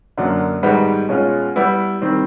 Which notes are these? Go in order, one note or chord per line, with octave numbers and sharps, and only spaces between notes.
F#2 D3 F#3 A#3 D4
G#2 D#3 G3 B3 D#4
B2 G#3 C#4 F4
G3 B3 E4
D#3 G3 C4